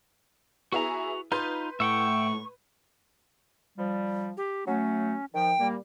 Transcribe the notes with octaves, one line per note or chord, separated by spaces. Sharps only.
B3 E4 F#4 G#4 A#5
D#4 F4 B4 C6 G6
A2 E5 F#5 G5 C#6
F3 G3
G4
F#3 A3 C#4
D#3 F3 G5
A#2 G3 A#3